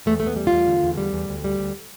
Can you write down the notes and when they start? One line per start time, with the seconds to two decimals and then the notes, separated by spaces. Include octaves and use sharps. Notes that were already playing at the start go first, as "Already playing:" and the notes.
0.06 E2 A3
0.20 E2 A3
0.27 B3
0.36 G3
0.47 F4
0.52 E2
0.67 D3
0.83 E2
0.97 G3
1.13 E2
1.29 D2
1.44 G3
1.59 D2